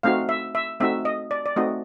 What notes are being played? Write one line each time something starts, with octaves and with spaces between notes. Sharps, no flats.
A3 C4 D#4 F#4 F5
E5
E5
A3 C4 D#4 F#4 E5
D#5
D5
D5
A3 C4 D#4 F#4 D#5